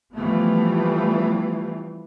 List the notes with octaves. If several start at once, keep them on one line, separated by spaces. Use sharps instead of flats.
E3 F3 G3 A3 B3